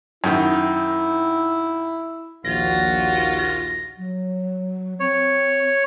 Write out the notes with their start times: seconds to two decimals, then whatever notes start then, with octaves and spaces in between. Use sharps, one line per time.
0.24 F#2 D#3 E4
2.45 A#1 D#2 F4 F#4 A#6
3.98 F#3
5.00 C4 C#5